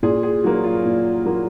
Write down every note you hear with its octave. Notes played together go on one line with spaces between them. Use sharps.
A#2 G#4
G#4
F#3 A#3 F#4
F4
A#2
F#3 A#3